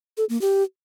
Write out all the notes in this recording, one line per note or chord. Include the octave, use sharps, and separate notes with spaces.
A4
A#3
G4